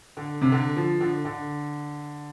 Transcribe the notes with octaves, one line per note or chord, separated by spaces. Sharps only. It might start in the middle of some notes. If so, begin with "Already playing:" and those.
D3
C3
D3
F3
D3
D3